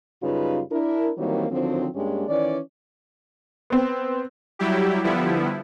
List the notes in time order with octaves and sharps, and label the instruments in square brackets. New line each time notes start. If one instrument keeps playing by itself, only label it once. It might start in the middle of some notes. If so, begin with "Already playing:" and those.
[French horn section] F#2 C#3 G3 D#4 F4 B4
D4 E4 A#4
D#3 E3 F#3 G3 A#3 C4
D3 D#3 F3 F#3 C4
G2 G#3 A#3 C#4 D4 G4
D#3 E3 C#4 D5
[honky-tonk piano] B3 C4
[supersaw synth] F#3 G3 E4 G4
D3 F3 G3 B3 E4